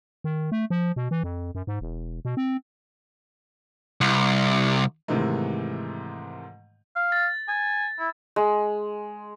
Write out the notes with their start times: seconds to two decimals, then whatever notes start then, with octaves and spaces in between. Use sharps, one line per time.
0.24 D#3
0.52 A3
0.70 F3
0.96 B2
1.11 E3
1.23 F2
1.55 F#2
1.67 G#2
1.81 E1
2.25 B2
2.37 C4
4.01 C2
5.08 G#2 C3 D#3 E3 G#3 A3
6.96 F5
7.12 A6
7.48 G#5
7.99 E4
8.36 G#3